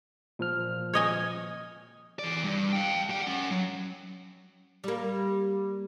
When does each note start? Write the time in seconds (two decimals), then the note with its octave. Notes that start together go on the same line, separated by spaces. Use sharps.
0.39 A#2 F3 F6
0.94 C#5 D#5 G#5
2.19 E3 D5
2.44 G2
2.73 F5 G5
3.10 G3 G5
3.22 C#4 F#5
3.51 F#3
4.84 G3 A#3